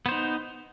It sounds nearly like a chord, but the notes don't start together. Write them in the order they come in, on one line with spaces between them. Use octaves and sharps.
B3 C5 D#4